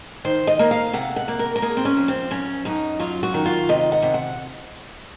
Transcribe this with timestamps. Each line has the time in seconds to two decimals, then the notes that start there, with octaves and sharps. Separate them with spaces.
0.25 D#3 C5
0.47 D#5
0.59 A#3
0.71 F5
0.93 C3 F#5
1.16 F#5
1.28 A#3
1.39 A#4
1.56 A#4
1.62 A#3 G#4
1.77 C4
1.85 C#4
1.97 F2
2.08 C4
2.31 F#2 C#4
2.65 F#2 D#4
3.00 F#3 F4
3.23 F#4
3.34 D#3
3.46 F4
3.69 C3 D#5
3.92 F#5
4.03 C3
4.14 F#5